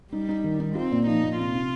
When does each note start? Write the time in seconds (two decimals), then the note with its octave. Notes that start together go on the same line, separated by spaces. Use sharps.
0.13 G3 D#4
0.29 D#4
0.44 D#3
0.60 D#4
0.75 C4 F4
0.92 A#2
1.07 F3 D#4
1.23 A#2
1.38 C3 F4
1.54 C3